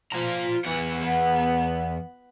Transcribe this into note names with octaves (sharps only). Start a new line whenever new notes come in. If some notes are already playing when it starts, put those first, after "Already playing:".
F3 F4 A#5
E2 E3 F#5
B3